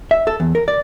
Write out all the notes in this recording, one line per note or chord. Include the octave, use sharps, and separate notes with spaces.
E5
A4
E2
A#4
D5